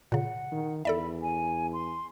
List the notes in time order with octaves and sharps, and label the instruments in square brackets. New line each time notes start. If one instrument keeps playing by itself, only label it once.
[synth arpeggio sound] A#2 C#3 [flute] F#5
[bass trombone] D#3
[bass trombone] E2 [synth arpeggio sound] A4 D5 E5 [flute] B5
[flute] G#5
C6